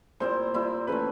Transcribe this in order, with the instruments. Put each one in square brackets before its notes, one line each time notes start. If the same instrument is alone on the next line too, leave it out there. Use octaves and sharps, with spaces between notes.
[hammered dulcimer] A#2 G3 C4 E4 [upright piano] C5
[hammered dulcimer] A#2 G3 C4 E4
[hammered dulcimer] C#3 E3 A3 [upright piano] B4